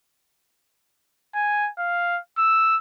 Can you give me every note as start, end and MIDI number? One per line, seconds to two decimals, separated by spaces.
1.35 1.70 80
1.79 2.19 77
2.38 2.77 88